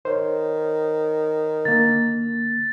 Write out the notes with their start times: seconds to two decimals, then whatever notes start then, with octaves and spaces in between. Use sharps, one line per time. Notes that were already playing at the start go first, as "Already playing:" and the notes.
0.05 D#3 C5 C#5
1.65 D3 A#3 A6